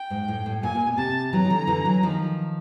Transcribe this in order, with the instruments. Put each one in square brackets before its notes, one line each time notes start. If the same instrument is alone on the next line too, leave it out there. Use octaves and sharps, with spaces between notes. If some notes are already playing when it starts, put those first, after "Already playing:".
Already playing: [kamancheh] G5
[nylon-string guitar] G#2
A2
A2
[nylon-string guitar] A#2 [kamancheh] G#5
[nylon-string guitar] A#2
B2
[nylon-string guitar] C3 [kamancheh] A5
[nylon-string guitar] E3 F#3 [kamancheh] A#5
[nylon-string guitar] D#3
D3 E3
D3 E3
E3 F#3
D#3 F3